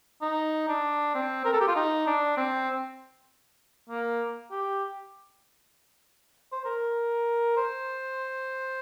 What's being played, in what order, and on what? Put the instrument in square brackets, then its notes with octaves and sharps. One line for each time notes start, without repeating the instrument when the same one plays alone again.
[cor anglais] D#4
D4
C4
A#4
A4
G4
F4
D#4
D4
C4
A#3
G4
C5
A#4
C5